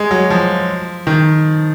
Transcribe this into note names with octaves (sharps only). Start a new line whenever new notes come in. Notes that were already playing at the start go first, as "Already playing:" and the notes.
Already playing: G#3
F#3
F3
D#3